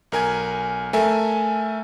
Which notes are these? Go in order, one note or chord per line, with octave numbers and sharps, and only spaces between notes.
B1 A#4 G#5 G#6
A3 A4 A#4 E5 G#5